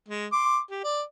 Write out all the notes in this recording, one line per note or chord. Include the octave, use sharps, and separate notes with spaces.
G#3
C6 D6
G4
D5